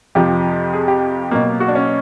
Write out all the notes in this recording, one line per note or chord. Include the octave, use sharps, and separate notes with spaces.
F2 C3 F3 G4
G#4
G4
B2 F#3 A#3
F#4
D4
C#4